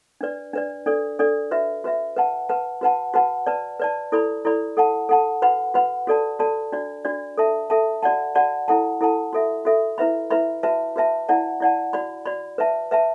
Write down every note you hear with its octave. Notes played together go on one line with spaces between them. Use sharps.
D4 B4 D5
D4 B4 D5
D4 A4 D5
D4 A4 D5
F#4 B4 E5
F#4 B4 E5
B4 F#5 A5
B4 F#5 A5
F#4 B4 F#5 A5
F#4 B4 F#5 A5
B4 D5 A5
B4 D5 A5
E4 A4 D5 B5
E4 A4 D5 B5
A4 F#5 A5
A4 F#5 A5
F#4 B4 F#5 B5
F#4 B4 F#5 B5
F#4 A4 D5 A5
F#4 A4 D5 A5
D4 F#4 D5
D4 F#4 D5
A4 E5 A5
A4 E5 A5
F#4 D5 F#5 A5
F#4 D5 F#5 A5
E4 A4 F#5 A5
E4 A4 F#5 A5
F#4 A4 E5
F#4 A4 E5
E4 B4 E5 B5
E4 B4 E5 B5
F#4 B4 E5 A5
F#4 B4 E5 A5
E4 D5 F#5 A5
E4 D5 F#5 A5
F#4 D5 B5
F#4 D5 B5
B4 E5 A5
B4 E5 A5